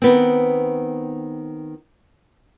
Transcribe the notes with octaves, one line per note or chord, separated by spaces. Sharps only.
D#3 B3 C4